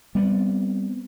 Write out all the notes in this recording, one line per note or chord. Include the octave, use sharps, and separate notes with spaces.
G3 B3 C4